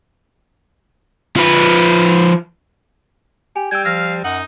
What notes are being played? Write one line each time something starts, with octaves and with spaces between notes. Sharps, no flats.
F3 B4
G4 G#5
G3 G5 E6 G#6
F3 F5 E6 F6 A#6
F#2 D#4 F#5